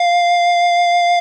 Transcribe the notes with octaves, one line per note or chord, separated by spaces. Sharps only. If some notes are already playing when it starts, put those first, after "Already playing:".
Already playing: F5